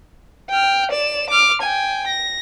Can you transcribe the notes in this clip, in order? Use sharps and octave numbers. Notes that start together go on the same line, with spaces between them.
G5 F6
D5 E7
D6 F6
G5 G#5
A#6